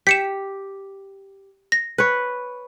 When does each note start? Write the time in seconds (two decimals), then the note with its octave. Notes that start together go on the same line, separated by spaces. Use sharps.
0.07 G4 B6 C#7 E7
1.72 A#6
1.98 B4 C#5